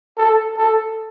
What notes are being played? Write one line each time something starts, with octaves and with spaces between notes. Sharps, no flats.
A4
A4